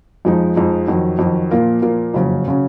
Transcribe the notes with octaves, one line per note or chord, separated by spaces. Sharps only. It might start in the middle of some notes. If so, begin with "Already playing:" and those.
F2 F3 G#3 D#4
F2 F3 G#3 D#4
F2 D#3 F#3
F2 D#3 F#3
A#2 F3 A#3 F4 A#4
A#2 F3 A#3 F4 A#4
F#1 F2 C#3 F#3 C#4
C#3 F#3 C#4